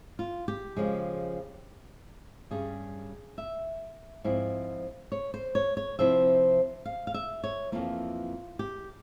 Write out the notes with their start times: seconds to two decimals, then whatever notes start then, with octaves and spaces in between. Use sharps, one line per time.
0.19 F4
0.48 G4
0.76 C#3 F3 G#3
2.51 G2 G3 C#4 G#4
3.38 E5
4.24 G#2 F3 C4 E4
5.12 C#5
5.34 C5
5.55 C#5
5.77 C#5
5.99 C3 F3 C4 E4 E5
6.85 F5
7.07 F5
7.14 E5
7.44 C#5
7.72 F2 E3 A#3 F4
8.59 G4